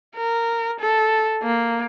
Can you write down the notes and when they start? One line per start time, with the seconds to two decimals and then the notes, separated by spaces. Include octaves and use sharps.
0.16 A#4
0.80 A4
1.43 A#3